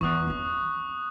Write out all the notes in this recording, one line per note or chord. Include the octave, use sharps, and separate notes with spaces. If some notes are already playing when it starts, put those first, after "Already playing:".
E2 E3 C#6 D#6 F#6
C4 C#4